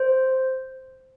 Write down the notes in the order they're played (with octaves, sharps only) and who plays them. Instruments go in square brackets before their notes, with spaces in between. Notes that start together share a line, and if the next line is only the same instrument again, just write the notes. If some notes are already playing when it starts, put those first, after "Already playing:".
Already playing: [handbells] C5